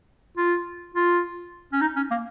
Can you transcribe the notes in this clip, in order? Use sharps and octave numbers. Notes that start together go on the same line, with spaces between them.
F4
F4
C#4
D#4
C#4
A#3